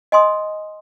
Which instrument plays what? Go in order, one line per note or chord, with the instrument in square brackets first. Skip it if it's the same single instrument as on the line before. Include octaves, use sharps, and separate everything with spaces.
[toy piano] D#5 G#5 C6 D#6